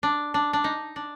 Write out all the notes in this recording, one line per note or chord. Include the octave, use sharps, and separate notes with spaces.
D4
D4
D4
D#4
D4